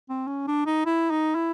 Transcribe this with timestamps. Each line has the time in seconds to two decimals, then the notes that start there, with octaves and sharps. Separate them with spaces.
0.09 C4
0.27 C#4
0.48 D4
0.66 D#4
0.86 E4
1.11 D#4
1.35 E4